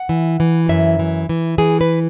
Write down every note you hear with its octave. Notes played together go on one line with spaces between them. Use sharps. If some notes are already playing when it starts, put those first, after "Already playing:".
Already playing: F#5
E3
E3
F#2 E5
E3
E3
E3 G#4
B4